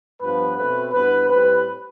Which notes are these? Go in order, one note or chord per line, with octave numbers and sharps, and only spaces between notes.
G2 F3 B3 B4
B2 A3 C4 B4
G2 E3 B3 B4
A2 G3 C4 B4